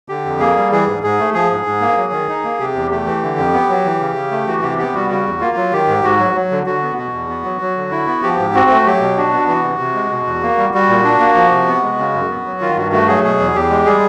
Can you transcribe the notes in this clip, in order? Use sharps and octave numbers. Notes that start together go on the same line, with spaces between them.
D3 G4
F2
A#3 G#4
G3
E3 G#4
G#2
G#2 G#4
A3
F3 G#4
G#2
G#2
A#3
F#3
D#3
D#4
A#3
C3 G4
E2
A3 G4
E3
D3
F2
B3
F#3
E3
C#3
C#3
A3
E3 F#4
C3 G4
B3 G4
G3 F#4
C#3 F#4
E2
A#3 F4
F#3
D#3 G4
G#2
G#2 F#4
F#3
F#3
D3
D3 F#4
B3
B2 F#4
E2
B3
F#3
F#3
D3
E4
B3
F3 G4
G#2
C4 F#4
A3
F#3 G4
B2
D4 F#4
B3
E3 F#4
C3
C3
G#3
B2
E2
A#3
G3
G3 F#4
A#2
D4
A#3
F3
C3
B3
G#3
C#3
F#2
B3
F#3
D#3 F4
G2 F#4
A3 F#4
F#3 G#4
B2 G#4
E2
E2 G4
G#3
G3 G#4